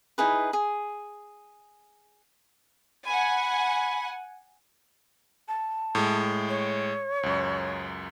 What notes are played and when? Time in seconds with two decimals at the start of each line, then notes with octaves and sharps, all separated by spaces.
0.18 D#4 E4 G#4 B4
0.53 G#4
3.07 F#5 G#5 B5
5.48 A5
5.95 A2 G#3
6.49 C#5
7.23 C#2 F#2